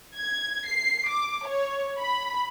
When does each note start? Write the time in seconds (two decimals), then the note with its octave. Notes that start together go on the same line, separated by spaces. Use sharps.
0.17 G#6
0.66 C7
1.09 D6
1.46 C#5
2.00 B5